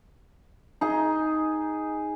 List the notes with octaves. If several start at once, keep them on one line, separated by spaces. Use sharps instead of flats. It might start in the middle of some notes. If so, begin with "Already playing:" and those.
D#4 G#4